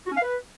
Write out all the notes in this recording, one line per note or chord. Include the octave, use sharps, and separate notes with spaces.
F#4
C#4
F5
B4